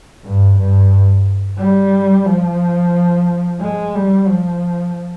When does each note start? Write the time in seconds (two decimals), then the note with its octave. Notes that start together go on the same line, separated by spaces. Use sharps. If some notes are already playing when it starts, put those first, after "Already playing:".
0.25 G2
0.58 G2
1.58 G3
2.26 F3
3.60 G#3
3.95 G3
4.28 F3